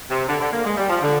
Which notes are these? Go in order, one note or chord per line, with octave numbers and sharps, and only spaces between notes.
C3
D3
D3
A#3
G#3
G3
F3
D3